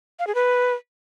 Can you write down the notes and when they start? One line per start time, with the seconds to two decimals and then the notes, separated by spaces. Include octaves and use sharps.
0.19 F5
0.27 G#4
0.35 B4